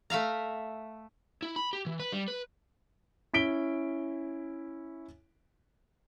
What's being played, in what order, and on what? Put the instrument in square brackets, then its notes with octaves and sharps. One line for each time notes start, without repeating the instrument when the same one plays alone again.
[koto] A3 E5 F5 A#5
[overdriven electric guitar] E4
B5
G4
E3
B4
G3
B4
[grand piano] C#4 E4 B6 D7 G7